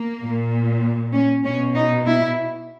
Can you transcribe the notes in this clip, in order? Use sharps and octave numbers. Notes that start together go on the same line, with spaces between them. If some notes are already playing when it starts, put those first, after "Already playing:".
Already playing: A#3
A#2
C#4
B2 C#4
D#4
E4